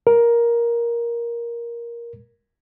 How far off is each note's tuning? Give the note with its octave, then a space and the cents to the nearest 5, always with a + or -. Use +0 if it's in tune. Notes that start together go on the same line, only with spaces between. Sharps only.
A#4 +10